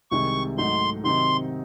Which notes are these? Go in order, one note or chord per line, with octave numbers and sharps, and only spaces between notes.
C2 C3 D#3 G#3 C#6
G#2 F#3 A3 D#4 C6
C3 D#3 F#3 C4 D#4 C6